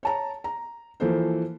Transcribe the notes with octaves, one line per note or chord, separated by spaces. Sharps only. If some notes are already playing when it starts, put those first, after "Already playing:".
C#5 A5 A#5
A#5
E3 F3 A#3 A4 C5